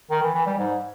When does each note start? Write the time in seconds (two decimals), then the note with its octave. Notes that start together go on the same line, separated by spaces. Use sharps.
0.11 D#3
0.23 E3
0.35 E3
0.46 G3
0.58 G#2